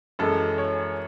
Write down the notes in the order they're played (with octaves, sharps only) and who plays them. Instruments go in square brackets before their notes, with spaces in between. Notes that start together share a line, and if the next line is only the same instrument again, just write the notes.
[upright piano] F#2 E3 G#3 A4
C#5